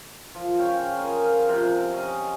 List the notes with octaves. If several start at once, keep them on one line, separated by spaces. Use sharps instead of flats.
F3
C#3 C#5 F5 G5
G#4 A#4 C5
F5
C3 F3
C#4 D#5